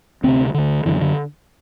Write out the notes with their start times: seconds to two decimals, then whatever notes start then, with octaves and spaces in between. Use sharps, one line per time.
0.24 D2 C3 C4
0.54 D2 D3
0.86 F#2 D3 E3
1.01 D3